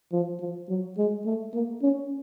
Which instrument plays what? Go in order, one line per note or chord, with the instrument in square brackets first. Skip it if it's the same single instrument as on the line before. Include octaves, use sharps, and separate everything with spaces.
[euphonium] F3
F3
F#3
G#3
A3
A#3
C#4